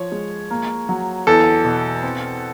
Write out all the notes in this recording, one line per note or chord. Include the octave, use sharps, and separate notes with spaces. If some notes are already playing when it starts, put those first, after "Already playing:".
Already playing: F3 C#5
G#3
A#3
F#3
E2 A4
B2
C4